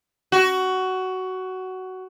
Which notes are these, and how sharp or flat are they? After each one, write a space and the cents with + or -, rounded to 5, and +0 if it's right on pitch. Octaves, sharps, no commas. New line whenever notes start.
F#4 +15